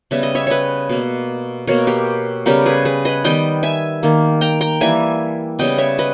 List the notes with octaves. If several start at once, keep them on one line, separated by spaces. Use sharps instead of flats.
C#3 G3 B3 E5
D#5
C#5 E5
B4 C#5 D#5
B2 A#3
B2 A#3 A#4 C#5
G4 A#4
C#3 G3 B3 G4 A#4
G#4 B4
G#4 B4
B4 D#5
D#3 G3 B3 D#5 G5
E5 G#5
D#3 A#3
G5 A#5
G5 A#5
E3 G3 A#3 E5 G#5
C#3 G3 B3 D#5 G5
C#5 E5
B4 D#5